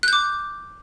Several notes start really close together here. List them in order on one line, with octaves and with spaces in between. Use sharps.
F#6 G6 D6